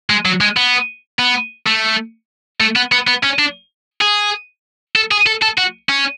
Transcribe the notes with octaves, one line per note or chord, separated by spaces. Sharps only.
G#3
F#3
G#3
B3
B3
A3
A3
B3
B3
B3
C#4
D4
G#4
A4
G#4
A4
A4
F#4
C#4